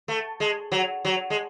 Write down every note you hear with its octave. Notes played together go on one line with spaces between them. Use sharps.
A3
G#3
F#3
F#3
G#3